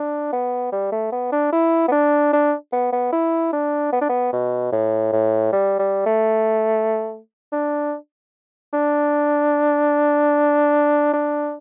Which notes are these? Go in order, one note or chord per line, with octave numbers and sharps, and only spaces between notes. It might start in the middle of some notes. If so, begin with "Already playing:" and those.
Already playing: D4
B3
G3
A3
B3
D4
E4
B3
D4
D4
B3
B3
E4
D4
B3
D4
B3
B2
A2
A2
G3
G3
A3
D4
D4
D4